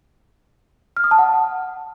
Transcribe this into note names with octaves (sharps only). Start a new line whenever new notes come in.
F6
D#6
A5
F#5